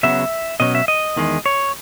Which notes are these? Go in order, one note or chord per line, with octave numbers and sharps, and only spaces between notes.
C#3 F#3 B3 E5
B2 F#3 C#4 D#5
E5
D#5
E2 D#3 G#3
C#5